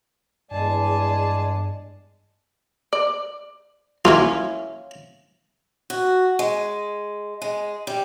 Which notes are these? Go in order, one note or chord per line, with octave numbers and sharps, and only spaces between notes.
E2 G2 G#3 G#4 D5 A5
D5
A#3 C#4 E4 F4
F#4
G#3
G#3
G3